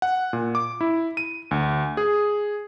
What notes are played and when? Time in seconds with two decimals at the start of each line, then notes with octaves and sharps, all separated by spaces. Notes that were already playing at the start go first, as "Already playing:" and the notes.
0.02 F#5
0.33 A#2
0.55 D6
0.81 E4
1.17 D#7
1.51 D2
1.97 G#4